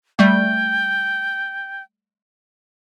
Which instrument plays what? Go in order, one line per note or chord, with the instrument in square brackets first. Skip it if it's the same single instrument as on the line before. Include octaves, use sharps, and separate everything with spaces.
[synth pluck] G3 A3 [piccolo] G5